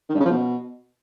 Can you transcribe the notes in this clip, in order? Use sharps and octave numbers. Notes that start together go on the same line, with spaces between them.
D#3
G2
C#3
F3
B2